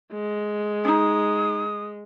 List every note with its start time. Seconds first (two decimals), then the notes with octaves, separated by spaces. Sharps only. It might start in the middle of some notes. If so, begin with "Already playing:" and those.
0.13 G#3
0.85 C#4 D#4 D#6